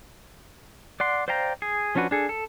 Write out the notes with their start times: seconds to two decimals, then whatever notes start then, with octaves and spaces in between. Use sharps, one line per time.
1.00 D5 F#5 C6
1.28 C5 D5 F5 G5 A#5
1.62 G#4
1.95 F3 C#4 D4 F#4 B4
2.11 D4 G#4 A4
2.29 A4